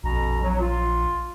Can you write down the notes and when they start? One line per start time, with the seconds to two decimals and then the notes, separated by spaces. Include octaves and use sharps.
0.03 A#1 F2 B2 A#5
0.43 F#3
0.60 F4